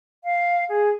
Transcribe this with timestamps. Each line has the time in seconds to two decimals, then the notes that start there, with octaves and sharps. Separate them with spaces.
0.24 F5
0.69 G#4